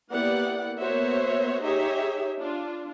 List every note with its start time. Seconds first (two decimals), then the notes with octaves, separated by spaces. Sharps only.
0.11 A#3 B3 E4 G4 D5 F#5
0.79 A#3 B3 F#4 C5 C#5 E5
1.63 D#4 G4 G#4 C#5 E5
2.39 D4 F4